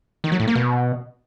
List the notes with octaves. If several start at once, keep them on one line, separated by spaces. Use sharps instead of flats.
D#3
F#3
A2
A#3
B2